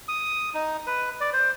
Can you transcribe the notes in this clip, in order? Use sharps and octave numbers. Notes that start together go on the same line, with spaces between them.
D#6
D#4
B4
D5
C5